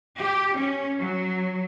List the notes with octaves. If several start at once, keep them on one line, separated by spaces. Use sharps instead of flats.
G4
C#4
F#3